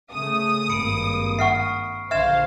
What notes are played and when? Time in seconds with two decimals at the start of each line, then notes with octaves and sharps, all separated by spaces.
0.12 C#3 A3 D#6
0.69 G#1 G2 A#3 B5 C#7 D7
1.39 E5 F#5 C#6 F6 C7
2.11 A#1 D3 C5 E5 F5 F6 G#6 E7